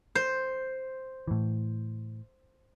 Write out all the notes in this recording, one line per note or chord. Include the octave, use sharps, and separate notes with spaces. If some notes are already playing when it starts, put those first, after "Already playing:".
C5
A2 E3